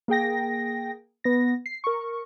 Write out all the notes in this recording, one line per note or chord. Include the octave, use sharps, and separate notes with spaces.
A#3 G#4 G5 A#6
B3 A#6
C7
A#4 C#6